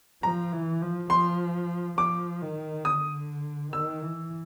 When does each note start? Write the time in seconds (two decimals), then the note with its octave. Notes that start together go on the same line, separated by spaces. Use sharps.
0.23 F3 A#5
0.52 E3
0.82 F3
1.10 F3 C6
1.98 F3 D6
2.41 D#3
2.85 D3 D#6
3.73 D#3 E6
4.02 E3